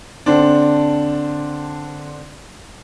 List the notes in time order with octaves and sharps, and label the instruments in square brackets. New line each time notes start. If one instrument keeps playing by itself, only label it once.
[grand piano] D3 C4 D4